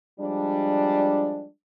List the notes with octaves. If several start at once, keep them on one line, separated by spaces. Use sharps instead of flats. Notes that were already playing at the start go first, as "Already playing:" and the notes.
F3 G3 G#3 D4